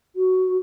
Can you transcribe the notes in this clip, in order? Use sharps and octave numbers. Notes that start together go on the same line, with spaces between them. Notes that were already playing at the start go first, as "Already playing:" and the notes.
F#4